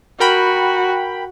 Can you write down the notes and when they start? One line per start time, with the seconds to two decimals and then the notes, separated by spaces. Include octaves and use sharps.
0.20 F#4 A#4 G5 B5